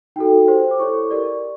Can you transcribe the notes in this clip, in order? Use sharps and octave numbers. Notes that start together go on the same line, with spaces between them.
D#4 F#4 A4 G5
G4 C5
D6
E4 A4 C#5 C#6
G4 A#4 D5